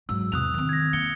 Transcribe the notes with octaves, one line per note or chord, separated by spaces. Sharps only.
G#2 F#3 E6
E2 C3 D#6 F#6 F7
D#3 C4
G#6 A#6
A#3 C#7 G7